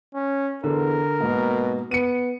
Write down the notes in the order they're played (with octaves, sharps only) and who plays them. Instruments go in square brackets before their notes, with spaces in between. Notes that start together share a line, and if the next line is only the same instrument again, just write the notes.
[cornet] C#4
[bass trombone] E2 [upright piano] D3 [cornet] A#4
[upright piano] G#2 A#3 [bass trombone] B2
[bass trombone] B3 [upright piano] C#7 D#7